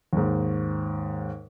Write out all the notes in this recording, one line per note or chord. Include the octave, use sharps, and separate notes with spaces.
D#2 G#2